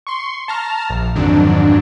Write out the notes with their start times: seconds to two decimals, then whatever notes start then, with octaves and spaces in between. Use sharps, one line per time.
0.07 C6 C#6
0.48 A5 A#5 F6
0.90 A#1
1.15 F2 G#2 D3 D#3 F#3 D4